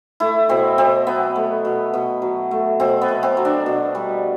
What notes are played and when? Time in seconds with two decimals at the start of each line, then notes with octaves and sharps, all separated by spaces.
0.20 A3 E4
0.49 B2 C4
0.78 B2 C4
1.07 F#3 B3
1.36 A3
1.65 B2
1.94 B2
2.22 F#3
2.51 A3
2.80 B2 C4
3.02 B3
3.08 B2
3.23 C4
3.37 F#3
3.45 D4
3.66 B2
3.95 G3